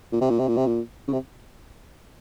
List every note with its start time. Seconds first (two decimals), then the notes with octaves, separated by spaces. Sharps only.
0.12 A#2
0.21 C3
0.30 A#2
0.39 C3
0.48 A#2
0.57 C3
0.66 A#2
1.08 C#3
1.13 C3